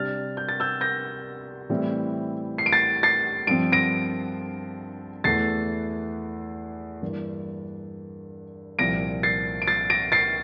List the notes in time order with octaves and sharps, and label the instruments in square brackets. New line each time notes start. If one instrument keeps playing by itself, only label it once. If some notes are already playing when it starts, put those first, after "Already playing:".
Already playing: [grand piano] C3 G3 D4 F6 A6
G6
A6
E6 G6
G6 A#6
A2 E3 G3 C4 E4
C7
D7
A6 C7
A6 C7
G2 F3 C4 D7
A#6 D7
E2 E3 A3 E4 A6 C7
G2 E3 A#3
C2 A#2 F3 C4 A#6 D7
A6 C7
D7
A6 C7
A#6 D7
A6 C7